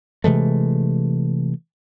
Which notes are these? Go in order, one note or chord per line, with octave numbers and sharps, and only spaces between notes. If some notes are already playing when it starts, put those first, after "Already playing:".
C3 E3 G#3 A3